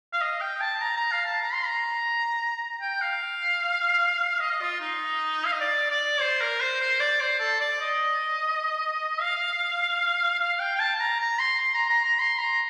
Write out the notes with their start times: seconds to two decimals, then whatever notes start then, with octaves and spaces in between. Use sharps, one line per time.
0.13 F5
0.21 D#5
0.41 G5
0.61 A5
0.81 A#5
0.97 A#5
1.12 F5
1.26 A5
1.41 A#5
1.53 C6
1.65 A#5
2.80 G5
3.01 F5
4.40 D#5
4.61 F4
4.80 D#4
5.45 F5
5.52 D#5
5.60 D5
5.91 D5
6.20 C5
6.41 A#4
6.61 C5
6.80 C5
7.00 D5
7.20 C5
7.40 A4
7.60 D5
7.81 D#5
9.20 F5
10.39 F5
10.60 G5
10.75 G5
10.79 A5
11.00 A#5
11.20 A#5
11.39 C6
11.59 C6
11.74 A#5
11.89 A#5
12.05 A#5
12.20 C6
12.39 A#5